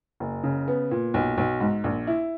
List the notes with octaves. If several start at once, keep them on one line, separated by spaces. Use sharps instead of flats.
F#1
C#3
B3
A#2
B1
B1
G#2
A#1
E4